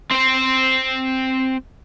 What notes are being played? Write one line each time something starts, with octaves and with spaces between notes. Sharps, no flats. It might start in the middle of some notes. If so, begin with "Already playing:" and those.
C4 C5